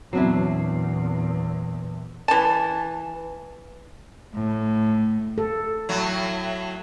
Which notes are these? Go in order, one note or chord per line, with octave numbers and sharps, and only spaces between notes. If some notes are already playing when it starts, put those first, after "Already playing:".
E2 A#2 F#3 B3 C4 D4 E4 C7
E3 A5
A2
A4
A2 F#3